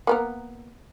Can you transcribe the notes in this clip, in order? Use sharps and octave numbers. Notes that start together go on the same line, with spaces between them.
A#3 B3 A#4